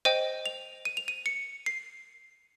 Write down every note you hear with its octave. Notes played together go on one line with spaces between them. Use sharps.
C5 D#5 G5 D#7
F7
D#7
F7
D#7
C#7
C7